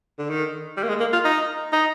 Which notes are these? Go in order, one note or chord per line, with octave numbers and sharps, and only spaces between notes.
D3
D#3
G3
A#3
G#3
A#3
F4
D#4
D#4